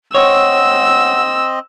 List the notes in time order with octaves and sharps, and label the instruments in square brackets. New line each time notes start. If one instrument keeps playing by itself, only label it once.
[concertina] C4 D#5 [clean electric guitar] C#5 [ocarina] F#5 [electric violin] E6